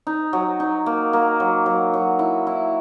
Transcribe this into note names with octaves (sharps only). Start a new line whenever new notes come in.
D#4
F#3
D#4
A#3
A#3
F#3
F#3
F#3
E4
E4